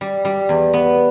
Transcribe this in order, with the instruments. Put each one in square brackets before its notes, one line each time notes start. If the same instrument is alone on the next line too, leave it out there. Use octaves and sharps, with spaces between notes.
[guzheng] G3
G3
E2
B3